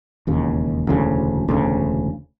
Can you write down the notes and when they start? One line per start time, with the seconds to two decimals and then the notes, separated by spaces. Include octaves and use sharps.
0.27 E1 D#2 C#3
0.87 E1 D2 C#3
1.48 E1 D2 C#3